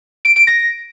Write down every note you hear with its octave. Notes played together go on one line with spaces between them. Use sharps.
D7
D7
A#6